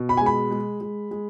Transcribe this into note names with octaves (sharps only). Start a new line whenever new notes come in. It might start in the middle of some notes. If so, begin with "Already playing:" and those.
Already playing: B2
B5
G#5
G#3
B5
G#3
G#3
G#3